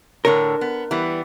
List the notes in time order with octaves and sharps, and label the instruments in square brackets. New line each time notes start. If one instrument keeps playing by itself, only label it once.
[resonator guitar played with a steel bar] A2 D3 C#5 [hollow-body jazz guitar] A#4
[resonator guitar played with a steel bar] B3
E3 G3 B3